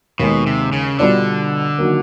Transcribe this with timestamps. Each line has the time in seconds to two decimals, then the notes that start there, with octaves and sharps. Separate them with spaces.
0.19 D#2 B2 D#3 G#3
0.47 C3
0.72 C#3
0.99 B2 D3 G3 B3 D4 F4
1.79 D#3 F#3 A#3